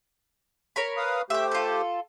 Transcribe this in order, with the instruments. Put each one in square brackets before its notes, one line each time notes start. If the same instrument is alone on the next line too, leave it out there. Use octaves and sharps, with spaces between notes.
[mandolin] A#4 C#5 B5
[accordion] B4 F5 D#6
[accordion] A3 G4 C5 [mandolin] E5 G5
[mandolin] F4 A4